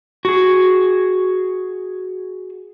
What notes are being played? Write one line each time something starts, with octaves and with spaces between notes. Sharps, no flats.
F#4 G#4